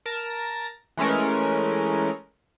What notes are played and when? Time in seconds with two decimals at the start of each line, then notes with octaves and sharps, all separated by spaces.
0.06 A#4 A5 A#6
0.97 E3 G#3 A3 C#4 A#4